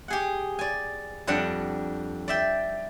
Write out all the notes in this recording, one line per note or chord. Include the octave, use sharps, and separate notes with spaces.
G4 G#4 F#5
D5 G#5
F2 G3 D4 F#5
D5 E5 G5